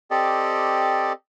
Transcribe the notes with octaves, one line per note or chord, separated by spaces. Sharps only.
C4 G4 A4 D5 D#5